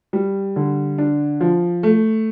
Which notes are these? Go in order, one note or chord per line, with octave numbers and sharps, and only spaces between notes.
G3
D3
D4
F3
A3